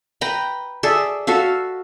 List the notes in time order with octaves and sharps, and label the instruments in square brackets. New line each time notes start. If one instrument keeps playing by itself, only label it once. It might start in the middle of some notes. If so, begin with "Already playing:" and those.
[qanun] B4 G5 A#5 B5
G#4 A4 D5 E5
F#4 A4 E5 F5